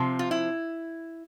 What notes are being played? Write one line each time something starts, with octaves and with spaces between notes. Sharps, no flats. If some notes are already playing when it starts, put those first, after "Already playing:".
Already playing: C3 F3 C4
F4
E4